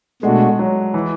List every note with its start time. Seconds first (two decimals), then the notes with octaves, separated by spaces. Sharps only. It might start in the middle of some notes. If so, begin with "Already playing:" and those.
0.23 B2 G#3 A3 D4 F#4
0.59 F#3
0.94 E3